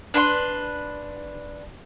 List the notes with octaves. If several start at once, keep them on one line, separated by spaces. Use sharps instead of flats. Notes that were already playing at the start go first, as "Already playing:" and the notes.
D4 B4 C6